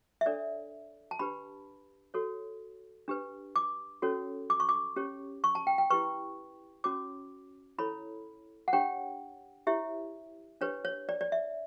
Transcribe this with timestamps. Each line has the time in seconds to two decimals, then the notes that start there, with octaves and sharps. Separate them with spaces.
0.21 E5
0.26 D4 A4 C#5 D5
1.11 A5
1.19 D4 G4 B4 B5
2.14 F#4 A4 C#5
3.08 D4 G4 B4
3.56 D6
4.02 C#4 F#4 A4 C#5
4.50 D6
4.60 C#6
4.69 D6
4.96 C#4 G4 C#5
5.44 C#6
5.55 A5
5.67 G5
5.78 G5
5.90 E4 G4 B4 C#6
6.84 C#4 F#4 C#5 D6
7.78 E4 A4 C#5 B5
8.68 F#5
8.73 D4 G4 C#5 G5
9.67 E4 G4 C#5 E5
10.61 D4 G4 B4 C#5
10.85 C#5
11.09 D5
11.21 D5
11.32 E5